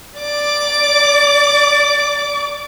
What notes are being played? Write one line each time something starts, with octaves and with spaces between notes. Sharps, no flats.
D5 D6